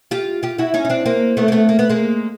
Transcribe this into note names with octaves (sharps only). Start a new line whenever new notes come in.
F4 G4
F4 G4
E4 F#4
C#4 D#4
D#4
C4 D4
A#3 C4
A3 B3
A#3
A3 B3
A#3
B3
G#3 A#3